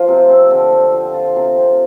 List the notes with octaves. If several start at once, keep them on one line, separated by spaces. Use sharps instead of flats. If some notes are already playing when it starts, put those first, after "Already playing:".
Already playing: F3 F4
C3
C4
D3
C4
F3
F4
C3
C4